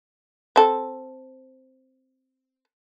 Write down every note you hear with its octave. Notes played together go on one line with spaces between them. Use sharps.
C4 A4